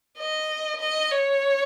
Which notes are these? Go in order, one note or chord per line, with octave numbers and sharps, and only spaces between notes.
D#5
D#5
C#5